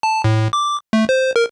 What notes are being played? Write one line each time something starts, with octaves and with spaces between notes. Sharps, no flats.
A5
A2
D6
A3
C5
A#4